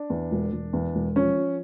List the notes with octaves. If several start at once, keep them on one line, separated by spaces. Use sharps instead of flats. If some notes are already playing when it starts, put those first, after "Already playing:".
Already playing: D4
E2
E1
E1
E2
E1
F3 C#4
F3